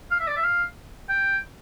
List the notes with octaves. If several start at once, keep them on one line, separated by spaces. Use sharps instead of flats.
F5
E5
D5
E5
F5
G5